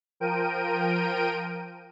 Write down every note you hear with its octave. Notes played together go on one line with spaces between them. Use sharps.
F3 A#4 G5 D7 D#7